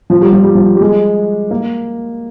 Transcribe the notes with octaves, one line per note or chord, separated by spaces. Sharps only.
F3
G3
F3
G3
F3
G3
G#3
A#3